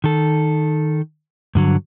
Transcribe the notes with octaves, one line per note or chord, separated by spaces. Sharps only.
D#3 A4
G2 D3 F#3